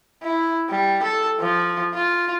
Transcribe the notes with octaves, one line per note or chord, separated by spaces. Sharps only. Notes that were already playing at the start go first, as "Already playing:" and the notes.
E4
G3
A4
F3
F4